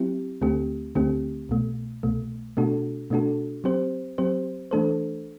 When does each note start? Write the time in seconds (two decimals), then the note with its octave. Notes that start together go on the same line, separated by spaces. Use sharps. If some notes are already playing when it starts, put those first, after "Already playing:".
Already playing: F#3 C4 E4 G4
0.41 D2 D3 A3 C4 G4
0.95 D2 D3 A3 C4 G4
1.49 C2 B2 A3
2.03 C2 B2 A3
2.57 B2 A3 D4 F#4 A4
3.10 B2 A3 D4 F#4 A4
3.64 F#3 C4 G4 C5
4.18 F#3 C4 G4 C5
4.71 E3 A3 D4 A4 C5